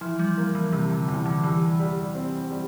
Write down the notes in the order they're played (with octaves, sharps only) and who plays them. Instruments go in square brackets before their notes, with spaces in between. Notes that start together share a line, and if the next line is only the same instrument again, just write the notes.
[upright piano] E3 [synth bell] F3
[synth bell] G3
[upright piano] A#3
[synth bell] E3
[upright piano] C3 [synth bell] E3
[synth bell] D3
[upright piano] E2 [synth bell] E3
[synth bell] D3
[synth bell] E3 [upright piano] G3
[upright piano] G3
C4
G3